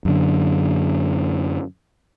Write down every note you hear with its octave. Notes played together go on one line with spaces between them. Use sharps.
F#2 D3